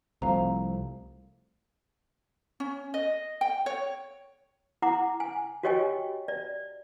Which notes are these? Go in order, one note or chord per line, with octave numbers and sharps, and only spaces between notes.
C2 F3 A3 C4 F5 A#5
C#4
D#5
G5
C#5
E4 F#5 A#5 D6
G#5
F#4 G4 C#5 D#5 G5 G#5
D5